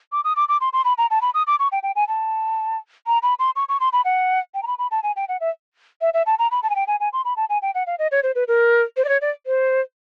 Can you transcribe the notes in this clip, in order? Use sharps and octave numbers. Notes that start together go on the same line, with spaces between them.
D6
D#6
D6
D6
C6
C6
B5
A#5
A5
B5
D#6
D6
C#6
G5
G5
G#5
A5
A#5
B5
C6
C#6
C#6
C6
B5
F#5
G5
A#5
B5
B5
A5
G#5
G5
F#5
E5
E5
E5
A5
A#5
B5
A5
G#5
G5
G#5
G#5
C6
B5
A5
G#5
G5
F#5
F5
D#5
C#5
C5
B4
A#4
C5
D5
C#5
D5
C5